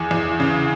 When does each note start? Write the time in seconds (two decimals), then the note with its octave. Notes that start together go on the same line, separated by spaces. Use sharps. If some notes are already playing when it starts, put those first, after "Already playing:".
Already playing: E2 G#4
0.11 E2
0.40 C#3